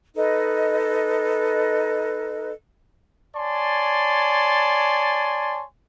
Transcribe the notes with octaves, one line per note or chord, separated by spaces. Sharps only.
D#4 A4 B4 D#5
C#5 D5 G#5 A5 C6